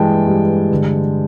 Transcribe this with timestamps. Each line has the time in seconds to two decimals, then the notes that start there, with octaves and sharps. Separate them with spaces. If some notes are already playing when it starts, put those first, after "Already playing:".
Already playing: G2 E3 G#3 G5 A5
0.27 G2
0.71 D3